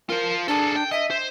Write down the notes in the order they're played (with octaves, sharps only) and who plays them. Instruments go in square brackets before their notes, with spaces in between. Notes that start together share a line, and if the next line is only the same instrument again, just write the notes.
[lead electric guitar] F4 C5 [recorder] A#4
[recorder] D4 [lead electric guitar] G#4 A4
[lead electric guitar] G5
[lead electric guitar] D#5 [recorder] E5
[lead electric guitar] C5